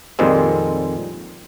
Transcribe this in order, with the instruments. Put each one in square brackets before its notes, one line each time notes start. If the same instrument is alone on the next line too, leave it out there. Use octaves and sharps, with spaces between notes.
[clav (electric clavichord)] F2 A#2 D#3 G3 G#3 C4